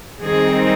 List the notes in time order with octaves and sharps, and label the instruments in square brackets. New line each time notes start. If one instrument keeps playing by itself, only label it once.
[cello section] D#3 G3 C4 D#4 G#4